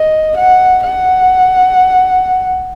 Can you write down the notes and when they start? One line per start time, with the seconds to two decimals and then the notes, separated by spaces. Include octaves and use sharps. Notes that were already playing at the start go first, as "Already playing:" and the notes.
Already playing: D#5
0.37 F#5
0.83 F#5